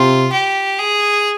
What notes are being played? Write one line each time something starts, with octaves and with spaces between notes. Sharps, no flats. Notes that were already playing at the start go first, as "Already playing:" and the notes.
Already playing: C3 F4
G4
G#4